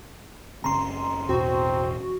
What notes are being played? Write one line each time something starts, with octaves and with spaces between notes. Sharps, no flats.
F#1 C#3 C4 A#5 C6
A1 E2 B2 C4 F#4